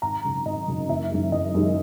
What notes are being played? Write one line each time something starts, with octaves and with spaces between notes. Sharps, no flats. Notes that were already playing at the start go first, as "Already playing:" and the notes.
G#1 A#5
F#2 C#3
G#1 D#5
F#2 C#3
F#1 E5
F#2 D#3 G#3
F#1 D#5
F#2 D#3 G#3